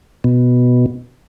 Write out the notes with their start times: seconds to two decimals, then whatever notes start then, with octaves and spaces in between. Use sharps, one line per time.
0.24 B2